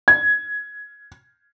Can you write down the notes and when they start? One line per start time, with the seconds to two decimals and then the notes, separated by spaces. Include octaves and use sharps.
0.08 G#6